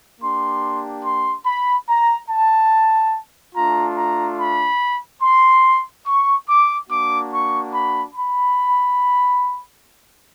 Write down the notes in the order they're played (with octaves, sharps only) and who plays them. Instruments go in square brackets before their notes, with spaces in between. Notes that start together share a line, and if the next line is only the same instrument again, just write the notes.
[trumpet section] A#3 D4 G4 C6
C6
B5
A#5
A5
A3 D4 F4 A#5
A#5
B5
C6
C#6
D6
A#3 D4 F#4 D6
C#6
B5
B5